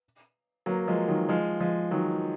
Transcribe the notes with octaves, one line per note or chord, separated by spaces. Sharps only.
F#3 A#3
F3 G#3
D#3 F#3
F3 G#3
F3 G#3
D#3 F#3